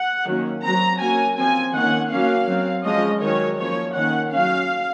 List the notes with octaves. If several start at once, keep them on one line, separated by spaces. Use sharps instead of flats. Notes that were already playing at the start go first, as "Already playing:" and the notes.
Already playing: F#5
D#3 F#3 A#3 C#4
F#3 C4 A#5
F#3 A#3 C#4 G#5
F3 C4 G#5
D#3 A#3 C#4 F#5
F#3 A#3 C#4 F5
F#3 C4
F3 G#3 C#4 D#5
D#3 F#3 C#4 C#5
F3 A#3 C#4 C#5
D#3 A#3 C#4 F#5
F#3 C#4 F5